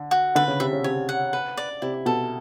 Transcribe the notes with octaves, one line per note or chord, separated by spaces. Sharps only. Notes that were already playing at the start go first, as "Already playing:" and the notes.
Already playing: D3
F#4
D3 B4
C#3
C3 E5
C#3
C3 C#5
F#5
B4
D5
C3 E4
B2 A4